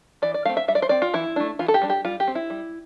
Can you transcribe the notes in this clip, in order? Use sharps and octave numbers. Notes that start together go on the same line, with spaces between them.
E3 D5
D5
A3 C4 F5
E5
G3 E5
D5
C5
C4 D5
F4
E3 E4
A3 D4
E3 F4
A4
G4
G3 D4
G4
G3 F4
G4
C4
E4
G3